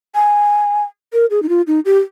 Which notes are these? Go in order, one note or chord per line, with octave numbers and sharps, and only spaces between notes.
G#5
A#4
G#4
D#4
F4
D#4
G4